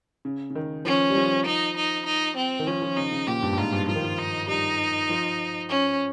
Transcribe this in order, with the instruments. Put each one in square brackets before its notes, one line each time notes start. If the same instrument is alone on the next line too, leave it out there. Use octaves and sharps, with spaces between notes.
[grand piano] C#3
C#3
D#3
[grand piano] F3 [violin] C#4
[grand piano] G3
F3
[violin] D#4
D#4
D#4
C4
[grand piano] D#3
[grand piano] F3 [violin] C#4
[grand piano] F3
[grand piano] C#3 [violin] D#4
[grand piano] C#3
[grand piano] A#2 [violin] G4
[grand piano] G2
G2
[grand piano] G#2 [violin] F4
[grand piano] G2
[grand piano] F3 [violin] F4
[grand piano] D#3
F3
[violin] D#4
[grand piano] G3 [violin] D#4
[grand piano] F3
[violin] C#4